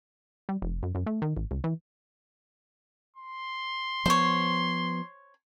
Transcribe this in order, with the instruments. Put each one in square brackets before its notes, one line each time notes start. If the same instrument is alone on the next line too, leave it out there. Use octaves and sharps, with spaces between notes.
[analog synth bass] G3
F1
F#2
F#2
A3
D#3
A1
C#2
E3
[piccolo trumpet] C6
[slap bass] F3 B3 [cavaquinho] C5 C#5